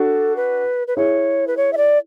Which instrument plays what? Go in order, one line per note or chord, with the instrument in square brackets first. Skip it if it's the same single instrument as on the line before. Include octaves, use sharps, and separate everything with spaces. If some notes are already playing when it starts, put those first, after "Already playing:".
Already playing: [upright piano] D4 F#4 [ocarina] A4
[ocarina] B4
B4
[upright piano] E4 G#4 [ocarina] C#5
[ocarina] B4
C#5
E5
D5